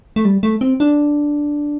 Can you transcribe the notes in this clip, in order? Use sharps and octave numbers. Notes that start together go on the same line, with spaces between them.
A3
G3
A3
C4
D4